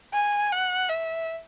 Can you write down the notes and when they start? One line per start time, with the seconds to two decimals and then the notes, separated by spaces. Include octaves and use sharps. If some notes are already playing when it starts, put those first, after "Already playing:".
0.13 G#5
0.52 F#5
0.89 E5